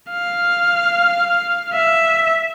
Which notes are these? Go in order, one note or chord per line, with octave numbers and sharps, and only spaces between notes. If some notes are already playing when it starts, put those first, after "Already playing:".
F5
E5